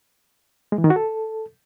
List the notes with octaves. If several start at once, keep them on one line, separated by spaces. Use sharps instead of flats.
G#3
E3
D#3
F#4
A4